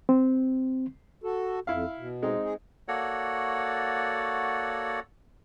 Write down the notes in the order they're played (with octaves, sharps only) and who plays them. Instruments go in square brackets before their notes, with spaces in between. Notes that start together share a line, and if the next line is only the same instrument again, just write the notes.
[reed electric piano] C4
[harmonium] F#4 A4
[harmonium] F2 [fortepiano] E4 F5
[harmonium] B2
[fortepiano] G#3 C4 D#4
[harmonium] G#4
[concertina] A#3 F#4 A4 C#5 D5 F#5